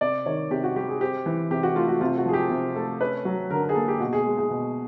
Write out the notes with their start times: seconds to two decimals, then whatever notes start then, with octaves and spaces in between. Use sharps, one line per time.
0.01 C3 D5
0.26 D#3 C#5
0.51 C3 G4
0.64 F#4
0.76 G3 G4
0.89 G#4
1.01 C4 G4
1.26 E3
1.51 C3 G4
1.63 F#4
1.76 A3 F4
1.88 F#4
2.01 C3 F4
2.18 F#4
2.26 F3 G#4
2.34 G4
2.50 C3
2.76 A3 A4
3.01 C#4 B4
3.25 F#3
3.50 D3 A#4
3.63 A#4
3.69 G#4
3.75 A#3 A4
3.88 G4
4.00 B2 F#4
4.13 G#4
4.25 G#3
4.38 G#4
4.50 B2